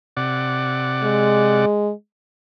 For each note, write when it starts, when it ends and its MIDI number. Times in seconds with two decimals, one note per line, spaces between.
0.17 1.65 48
0.17 1.65 74
0.17 1.65 78
1.03 1.91 56